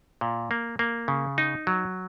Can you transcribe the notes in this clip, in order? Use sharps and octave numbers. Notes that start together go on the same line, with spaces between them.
A#2
A#3
A#3
C#3
D#4
F#3